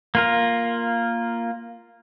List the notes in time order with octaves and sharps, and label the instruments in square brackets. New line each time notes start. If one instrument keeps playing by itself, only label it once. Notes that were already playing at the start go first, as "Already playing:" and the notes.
[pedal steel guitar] A#3 F4 A#4